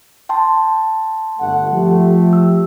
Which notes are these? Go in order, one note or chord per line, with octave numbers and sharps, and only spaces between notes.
G5 A5 C6
G1 A3 F#5
F3 A3 G4
E6